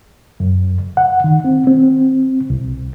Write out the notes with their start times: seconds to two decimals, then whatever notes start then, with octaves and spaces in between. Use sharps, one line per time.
0.40 F#2
0.97 F#5
1.24 D#3
1.45 C4
1.67 C4
2.50 C2